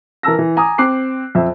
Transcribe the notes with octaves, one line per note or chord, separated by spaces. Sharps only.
E3 A#4 A5 E6 A#6
E3
G#5 A#5 D6 D#6
C4 D6 F#6 C7
F2 E5